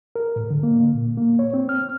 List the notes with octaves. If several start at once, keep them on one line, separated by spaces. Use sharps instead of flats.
A#4
A2
D3
A#3
A#2
A#3
C#5
C4
F6